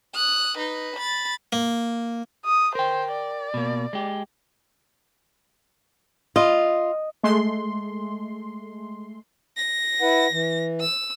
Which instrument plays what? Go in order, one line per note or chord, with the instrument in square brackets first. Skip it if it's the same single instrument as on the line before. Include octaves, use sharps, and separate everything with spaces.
[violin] D#6 F#6
D#4 B4
B5 A6
[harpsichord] A#3
[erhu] D#6
[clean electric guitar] A#4 G5 [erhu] C5
[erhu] D5
[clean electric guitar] B2 A#3
G#3 G4
[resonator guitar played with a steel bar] F4 [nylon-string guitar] D#5
[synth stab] G#3 A3 C6
[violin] A#6
[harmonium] E4 B4 F#5
E3
[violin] E6